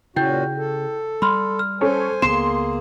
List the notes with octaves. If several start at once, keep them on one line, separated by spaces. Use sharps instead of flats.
A#2 C#3 C#4 E4 F#4 G5 G6
A4
G3 B5 C6 F6
F6
C#4 A4 C5 C#5 G#5
C#2 A#3 B3 G#4 C6 C7 E7